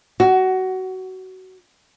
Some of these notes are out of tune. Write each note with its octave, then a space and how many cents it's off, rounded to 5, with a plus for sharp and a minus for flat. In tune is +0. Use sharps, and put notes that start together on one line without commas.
F#4 +20